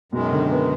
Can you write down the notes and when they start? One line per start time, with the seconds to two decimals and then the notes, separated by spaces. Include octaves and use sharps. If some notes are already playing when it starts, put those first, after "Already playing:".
0.12 F#2 B2 D#3 G#3
0.32 D3
0.51 B3